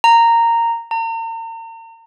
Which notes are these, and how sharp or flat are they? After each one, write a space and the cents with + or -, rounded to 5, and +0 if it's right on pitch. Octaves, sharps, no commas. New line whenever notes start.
A#5 -10
A#5 -40